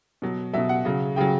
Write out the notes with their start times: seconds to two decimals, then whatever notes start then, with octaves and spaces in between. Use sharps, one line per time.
0.22 B2 F#3
0.53 F#3 E5
0.58 B2
0.69 F#5
0.85 C#3 F#3
1.16 C#3 F#3 G5